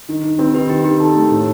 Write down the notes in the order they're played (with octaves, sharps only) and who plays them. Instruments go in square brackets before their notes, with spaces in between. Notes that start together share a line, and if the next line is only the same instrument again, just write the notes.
[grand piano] D#3
D#3
[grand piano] C4 [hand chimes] G4 B4
[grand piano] D#3 [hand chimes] G4 B4
[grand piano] D#3 [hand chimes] G4 B4
[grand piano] D#3 [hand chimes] G4
[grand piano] A4
A3
A2